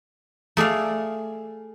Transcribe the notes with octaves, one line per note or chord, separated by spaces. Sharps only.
A3 G#4 D5 F5